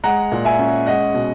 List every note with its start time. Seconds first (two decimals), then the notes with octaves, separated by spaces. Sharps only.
0.04 G#3 F#5 A#5
0.32 A#2
0.45 E5 G#5
0.59 C#4
0.86 G#3 D#5 F#5
1.14 B2